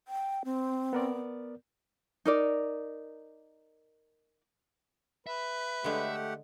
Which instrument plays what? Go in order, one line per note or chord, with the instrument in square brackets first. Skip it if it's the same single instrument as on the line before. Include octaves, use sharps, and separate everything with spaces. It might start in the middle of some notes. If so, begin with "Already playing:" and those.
[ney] G5
C4
[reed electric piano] B3 A#4 D5
[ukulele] D#4 A#4 D5
[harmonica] B4 [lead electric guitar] E5
[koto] D3 G#3 [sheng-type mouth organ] A3 G4 F#5